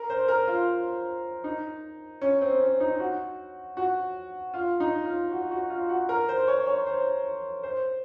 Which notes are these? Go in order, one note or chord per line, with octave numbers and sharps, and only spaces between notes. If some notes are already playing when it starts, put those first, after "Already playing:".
Already playing: A#4
C5
A#4
F4
D#4
C#4
C4
C#4
D#4
F#4
F#4
F4
D#4
F4
F#4
F#4
F4
F#4
A#4
C5
C#5
C#5
C5
C5